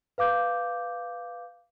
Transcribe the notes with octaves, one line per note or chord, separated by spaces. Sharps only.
B4 F5 D6 G6